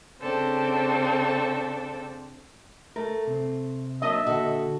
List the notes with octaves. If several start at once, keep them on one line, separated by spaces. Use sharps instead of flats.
C#3 C4 D4 A4
A3 A#4
C3 C4
F#3 A#3 D4 D#5 E5
A#2 D3 F#4 A4